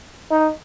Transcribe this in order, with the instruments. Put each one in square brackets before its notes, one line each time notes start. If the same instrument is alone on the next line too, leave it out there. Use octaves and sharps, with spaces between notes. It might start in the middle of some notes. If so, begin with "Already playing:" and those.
[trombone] D#4